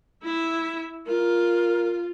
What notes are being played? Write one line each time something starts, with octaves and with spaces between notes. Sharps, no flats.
E4 E5
F4 A#4